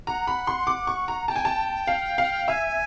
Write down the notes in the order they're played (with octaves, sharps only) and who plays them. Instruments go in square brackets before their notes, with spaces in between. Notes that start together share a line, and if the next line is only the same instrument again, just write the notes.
[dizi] F#5 [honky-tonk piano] A#5
[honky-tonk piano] B5
C6
D6
C#6
A#5
[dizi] G5 [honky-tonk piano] A5
[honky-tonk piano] G#5
A5
F5
F5
[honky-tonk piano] E5 [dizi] G#5